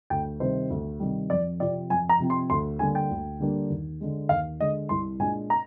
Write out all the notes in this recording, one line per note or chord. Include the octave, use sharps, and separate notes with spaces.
D2 G5
C3 D#3 G3 C5
D2
C3 D#3 G3
F2 D5
C3 F3 C4 D5
F2 G#5
A#5
C3 F3 C4
C6
D2 C6
D3 G3 A#3 D4 G#5
G5
D2
D3 G3 A#3 D4
D#2
D3 G#3
D#2 F5
D3 G#3 D#5
C2 C6
A#2 G#3 D4 G#5
A#5